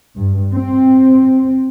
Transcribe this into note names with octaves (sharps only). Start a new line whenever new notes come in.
G2
C4